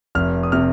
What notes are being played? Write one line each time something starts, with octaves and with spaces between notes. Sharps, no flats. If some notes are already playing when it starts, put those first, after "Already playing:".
F1 F6
D#6
C3 F6